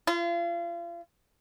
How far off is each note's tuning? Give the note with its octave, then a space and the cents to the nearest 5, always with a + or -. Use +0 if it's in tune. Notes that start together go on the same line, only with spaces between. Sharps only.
F4 -35